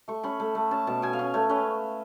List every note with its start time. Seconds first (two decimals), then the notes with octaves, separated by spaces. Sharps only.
0.08 A3 C#6
0.24 C#4 B5
0.40 A3
0.55 A3
0.71 C#4 A5
0.87 B2 A5
1.02 B2 G#5
1.13 F5
1.19 C#4
1.34 A3 C#5
1.49 C#4 B4